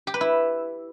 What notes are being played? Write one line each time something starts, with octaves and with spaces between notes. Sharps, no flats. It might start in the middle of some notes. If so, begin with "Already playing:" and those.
G4
B4
E4